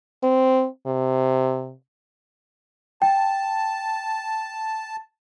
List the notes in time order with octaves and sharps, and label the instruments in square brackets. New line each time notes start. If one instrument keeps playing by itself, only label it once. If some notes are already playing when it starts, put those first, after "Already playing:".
[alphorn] C4
C3
[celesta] G5 [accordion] A5